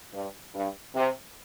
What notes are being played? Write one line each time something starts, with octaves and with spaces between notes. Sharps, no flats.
G2
G2
C3